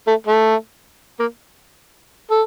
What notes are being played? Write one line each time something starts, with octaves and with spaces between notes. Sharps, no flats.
A3
A3
A#3
A4